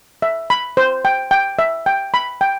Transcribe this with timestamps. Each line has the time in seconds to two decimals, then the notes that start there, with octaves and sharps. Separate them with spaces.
0.22 E5
0.50 B5
0.77 C5
1.05 G5
1.31 G5
1.59 E5
1.86 G5
2.14 B5
2.41 G5